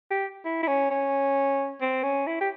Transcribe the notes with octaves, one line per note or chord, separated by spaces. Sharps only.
G4
E4
E4
C#4
C#4
C4
C#4
E4
G4